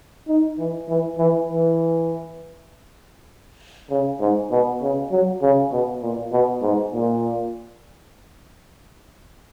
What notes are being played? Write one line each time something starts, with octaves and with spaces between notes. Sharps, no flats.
D#4
E3
E3
E3
E3
C#3
G#2
B2
C#3
F#3
C#3
B2
A#2
B2
G#2
A#2